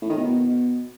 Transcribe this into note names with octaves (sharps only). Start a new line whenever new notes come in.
A2
D#3
B2